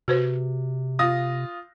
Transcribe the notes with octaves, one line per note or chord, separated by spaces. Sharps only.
C3 F#4 B4 C5
F4 D#6 A#6